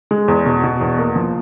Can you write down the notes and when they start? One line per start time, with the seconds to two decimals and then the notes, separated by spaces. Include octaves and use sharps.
0.11 G#3
0.28 E2
0.46 B2
0.63 B2
0.81 E2
0.99 A#3
1.16 F3